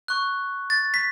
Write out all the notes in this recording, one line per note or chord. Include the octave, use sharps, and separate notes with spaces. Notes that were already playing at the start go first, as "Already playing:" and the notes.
C#6 F#6
A6
B6